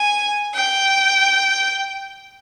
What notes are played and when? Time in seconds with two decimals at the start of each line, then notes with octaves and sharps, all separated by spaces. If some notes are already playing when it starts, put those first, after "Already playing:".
Already playing: G#5
0.54 G5